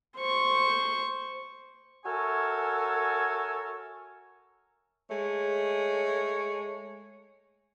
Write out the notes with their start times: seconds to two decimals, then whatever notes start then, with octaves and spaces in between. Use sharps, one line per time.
0.18 C5 C#6
2.05 F#4 A4 A#4 C#5 E5 G#5
5.10 G#3 A3 C#5